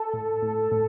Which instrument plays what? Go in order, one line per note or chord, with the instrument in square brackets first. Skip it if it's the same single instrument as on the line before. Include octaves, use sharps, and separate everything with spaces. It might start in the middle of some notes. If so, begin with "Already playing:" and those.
Already playing: [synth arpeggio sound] A4
A2
A2
A2